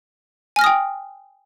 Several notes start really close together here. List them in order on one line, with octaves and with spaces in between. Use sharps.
G#5 F6 A#6 D#6 G5